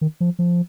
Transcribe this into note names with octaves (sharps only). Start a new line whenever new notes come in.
D#3
F3
F3